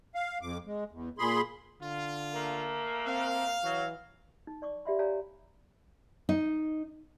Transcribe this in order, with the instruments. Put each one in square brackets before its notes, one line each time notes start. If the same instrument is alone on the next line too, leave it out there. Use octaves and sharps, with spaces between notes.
[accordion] F5
F2 D6
G#3
E2
A#2 G#4 B5 C6
[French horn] D3 [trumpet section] F4
[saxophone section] A3 A#3
[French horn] C4 [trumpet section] F5
[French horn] E3 [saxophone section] F#3
[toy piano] D#4
D5 C#6 D6
G4 D5 E5 F5 B5 C6
G4 C#5 D5 F5 G#5 A#5
[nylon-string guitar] D#4